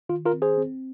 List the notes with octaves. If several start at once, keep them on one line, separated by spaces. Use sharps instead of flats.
D#3 F4
F4 A#4
C4
G#4 C5
C4